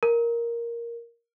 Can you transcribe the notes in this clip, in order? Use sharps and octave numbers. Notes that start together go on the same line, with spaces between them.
A#4